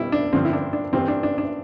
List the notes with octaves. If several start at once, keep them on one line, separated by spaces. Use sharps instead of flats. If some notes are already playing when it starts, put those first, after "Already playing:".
Already playing: B2 G3 E4
D4
G2 D3 F3 C4
E4
D4
D4
G2 E3 G3 C4
D4
D4
D4